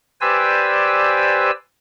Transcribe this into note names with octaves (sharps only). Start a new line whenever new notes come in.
G4 B4 C5 D5 G#5 E6